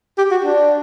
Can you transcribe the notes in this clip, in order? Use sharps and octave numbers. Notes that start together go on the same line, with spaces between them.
G4
F#4
D4